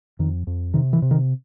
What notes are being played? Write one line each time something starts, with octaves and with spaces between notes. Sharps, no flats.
F2 D#3
F2
C3 D#3
E3
C3
D#3